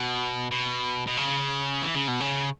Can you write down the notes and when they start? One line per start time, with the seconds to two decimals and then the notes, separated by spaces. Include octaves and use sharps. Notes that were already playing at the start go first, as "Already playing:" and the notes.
Already playing: B2
0.51 B2
1.07 B2
1.17 C#3
1.82 E3
1.95 C#3
2.08 B2
2.20 C#3